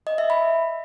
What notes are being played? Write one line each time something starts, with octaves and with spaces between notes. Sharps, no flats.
D#5
E5
B5